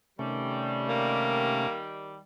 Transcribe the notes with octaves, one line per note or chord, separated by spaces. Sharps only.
C3 D#3 G3 A3 C#4
A#3